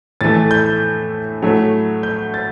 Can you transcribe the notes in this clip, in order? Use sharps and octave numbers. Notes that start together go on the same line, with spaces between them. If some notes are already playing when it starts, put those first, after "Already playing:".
A2 E3 A3 A6
G6
A2 F#3 A3
G6
A6